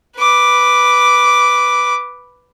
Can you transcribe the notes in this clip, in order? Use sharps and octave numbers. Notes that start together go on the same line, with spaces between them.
B4 D6